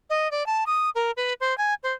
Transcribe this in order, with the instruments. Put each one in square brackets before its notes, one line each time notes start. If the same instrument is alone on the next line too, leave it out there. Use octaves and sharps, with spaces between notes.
[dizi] D#5
D5
A5
D#6
A#4
B4
C5
G#5
C5